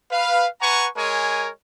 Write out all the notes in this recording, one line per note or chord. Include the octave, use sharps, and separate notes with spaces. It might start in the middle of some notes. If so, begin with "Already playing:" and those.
B4 F5
B4 F#5 G#5 A#5 C#6
G#3 A#4 C#5 G#5